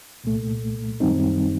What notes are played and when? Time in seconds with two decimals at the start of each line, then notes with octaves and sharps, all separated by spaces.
0.24 C2 A#2 A3
1.00 F#2 D#3 G3 C4 D#4